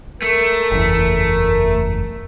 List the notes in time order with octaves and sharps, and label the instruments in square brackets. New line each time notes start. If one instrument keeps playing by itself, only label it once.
[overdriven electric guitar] A3 [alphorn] A#4
[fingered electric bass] F#1 E2